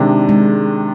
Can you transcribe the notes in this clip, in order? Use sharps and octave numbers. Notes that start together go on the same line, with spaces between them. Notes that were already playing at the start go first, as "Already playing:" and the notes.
Already playing: C3 D#3 G#3 D4
G#3